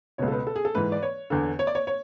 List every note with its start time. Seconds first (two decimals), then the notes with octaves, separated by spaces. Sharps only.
0.18 C#2 B2 C#5
0.28 A4
0.32 B4
0.47 A4
0.56 G#4
0.65 A4
0.75 G#2 E3 B4
0.92 D5
1.02 C#5
1.30 E2 D3
1.59 C#5
1.67 D5
1.75 C#5
1.87 C#5